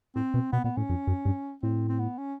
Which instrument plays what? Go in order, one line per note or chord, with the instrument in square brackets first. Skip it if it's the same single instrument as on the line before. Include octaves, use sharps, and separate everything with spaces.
[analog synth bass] A2 [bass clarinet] C4
[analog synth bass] B2
[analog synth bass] B2 [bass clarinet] B3
[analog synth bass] A#2 [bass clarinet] B3
[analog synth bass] A2 [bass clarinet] C#4
[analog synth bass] F2
F#2
G2
[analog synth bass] A2 [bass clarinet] C4
[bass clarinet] C4
B3
C#4